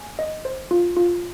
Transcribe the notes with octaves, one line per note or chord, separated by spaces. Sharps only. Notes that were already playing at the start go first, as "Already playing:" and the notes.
Already playing: G#5
D#5
C5
F4
F4